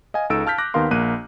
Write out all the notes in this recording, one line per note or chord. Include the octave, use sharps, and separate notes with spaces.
D#5 F5 G#5
C#2 D#4 A4 E6 D7
F5 A5 F6 G6 B6
D6 F#6 A#6
D#2 D#3 B3 A#4 F5 C6
A#1 A#3 F#6 D#7